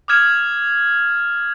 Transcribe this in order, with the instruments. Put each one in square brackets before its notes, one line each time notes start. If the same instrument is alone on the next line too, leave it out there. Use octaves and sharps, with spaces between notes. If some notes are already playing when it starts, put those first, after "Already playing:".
[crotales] D6 D#6 F6 G#6 E7